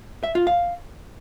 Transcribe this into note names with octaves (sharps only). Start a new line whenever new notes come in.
E5
F4
F5